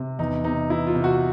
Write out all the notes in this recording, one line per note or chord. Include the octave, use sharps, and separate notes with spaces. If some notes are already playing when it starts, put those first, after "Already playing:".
Already playing: C3
E2 D#4
C3 D#4
E3 E4
F4
C3
F#4